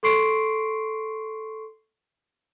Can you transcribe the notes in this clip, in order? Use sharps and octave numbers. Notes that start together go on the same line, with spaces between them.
A4 C6 C#6 C7 D7